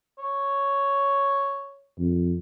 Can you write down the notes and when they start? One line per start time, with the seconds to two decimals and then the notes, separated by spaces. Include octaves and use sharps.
0.18 C#5
1.99 F2